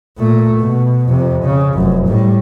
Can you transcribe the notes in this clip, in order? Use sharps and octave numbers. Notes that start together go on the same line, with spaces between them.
A#2 A3
B2
F2 C3
C#3
F1 F#2
A2 G3